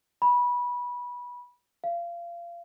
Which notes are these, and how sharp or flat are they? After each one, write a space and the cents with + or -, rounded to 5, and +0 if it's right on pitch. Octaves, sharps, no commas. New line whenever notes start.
B5 -20
F5 -25